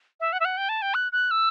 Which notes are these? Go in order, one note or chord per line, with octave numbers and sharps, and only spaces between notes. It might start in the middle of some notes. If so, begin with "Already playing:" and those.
E5
F#5
E5
F#5
G5
A5
G5
F#6
F#6
E6